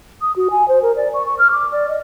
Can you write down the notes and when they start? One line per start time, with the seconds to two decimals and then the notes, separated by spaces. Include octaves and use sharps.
0.21 D#6
0.36 F#4
0.51 G#5
0.68 C5
0.82 A#4
0.96 D5
1.14 C#6
1.26 C#6
1.39 F6
1.51 D6
1.72 D5
1.89 D#5